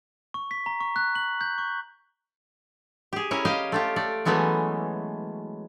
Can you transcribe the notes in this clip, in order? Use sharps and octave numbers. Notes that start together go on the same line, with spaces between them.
C#6
B6
A#5
C#6
F#6
F#7
G6
C#6
G4 G#4
C#4 E4 A#4 C#5
G4 D#5 F5 G5
A3 F4 G4
A3 D5
E3 F#3 G#3 A3 B3 C#4